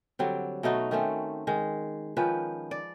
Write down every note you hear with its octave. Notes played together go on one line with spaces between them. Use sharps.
D3 F#3 G3 C4
B2 A3 D#4 F#4
D#3 A3 C4 C#4
D#3 G#3
D#3 F3 C#4 B4
D5